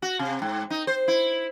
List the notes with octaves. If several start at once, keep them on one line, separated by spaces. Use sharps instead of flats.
F#4
C3
G#2
D#4
C5
E4